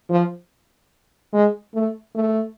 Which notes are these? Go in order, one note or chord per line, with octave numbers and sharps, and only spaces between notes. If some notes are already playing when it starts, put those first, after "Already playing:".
F3
G#3
A3
A3